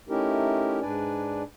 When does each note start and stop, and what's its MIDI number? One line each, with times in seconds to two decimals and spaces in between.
0.09 0.80 57
0.09 0.80 61
0.09 0.80 63
0.09 0.80 64
0.09 0.80 67
0.09 0.80 70
0.81 1.43 44
0.81 1.43 62
0.81 1.43 71
0.81 1.43 74
0.81 1.43 80